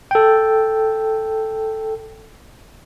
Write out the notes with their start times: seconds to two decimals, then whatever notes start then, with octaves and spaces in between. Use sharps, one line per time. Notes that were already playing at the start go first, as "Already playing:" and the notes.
0.11 A4 G5